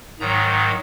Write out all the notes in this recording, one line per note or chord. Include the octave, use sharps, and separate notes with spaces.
G#2 D#3 F#3 A#5